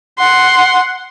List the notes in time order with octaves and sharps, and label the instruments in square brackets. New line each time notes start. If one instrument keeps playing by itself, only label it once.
[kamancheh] F#5 C6